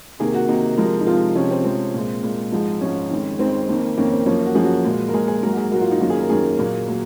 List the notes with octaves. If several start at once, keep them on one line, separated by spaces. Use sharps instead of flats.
C3 D#3 A#3 G#4
F#4
C3 D#3 A#3 D#4
C3 F3 G#3 A#4
D#4
C3 F3 G#3 F4
C3 F3 G#3 C#4
C4
C3 F3 G#3 C4
A#2 G#3
A#2 G#3
G#2 F3 G#3
G#2 F3 G#3 C#4
F2 D#3 G#3
F2 D#3 G#3 C4
F2 D#3 A#3
F2 D#3 A#3 C#4
C4
F#2 F3 A#3 C#4
F#4
F#2 F3 A#3 G#4
F#4
A#2 G#3
A#4
A#2 G#3 G#4
G#4
G#2 F#3 A#3 A#4
F#4
G#4
G#2 F#3 A#3 F#4
F4
D#4
F#2 D#3 A#3 F4
G#4
A#4
F#2 D#3 A#3 G#4
A#2 F#3 A#3
F#3 A#3